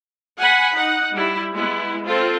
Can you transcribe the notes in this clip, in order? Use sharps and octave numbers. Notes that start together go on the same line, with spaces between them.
F#5 G#5 B5
D#4 F#5
G3 E4
G#3 B3 E4
C4 F4 A4